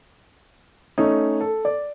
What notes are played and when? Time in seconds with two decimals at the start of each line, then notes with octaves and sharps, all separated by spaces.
0.98 A3 C#4 D#4
1.41 A4
1.65 D5